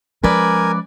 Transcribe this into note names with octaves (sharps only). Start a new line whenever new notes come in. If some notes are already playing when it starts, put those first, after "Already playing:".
F3 G#3 C#4 A#4 B4 D5 G#5